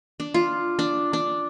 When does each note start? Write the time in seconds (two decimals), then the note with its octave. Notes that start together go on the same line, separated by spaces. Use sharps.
0.20 D4
0.34 F4
0.79 D4
1.13 D4